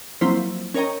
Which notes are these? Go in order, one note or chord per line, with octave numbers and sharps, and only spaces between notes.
F3 F#3 A#3 C4 E4 C5
C#4 A#4 C#5 D#5 G5 A#5